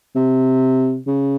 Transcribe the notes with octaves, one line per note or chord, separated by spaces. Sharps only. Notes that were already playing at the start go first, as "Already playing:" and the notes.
C3
C#3